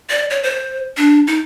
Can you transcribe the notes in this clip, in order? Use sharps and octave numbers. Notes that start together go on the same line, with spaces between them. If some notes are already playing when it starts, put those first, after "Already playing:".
D5
C#5
C5
D4
D#4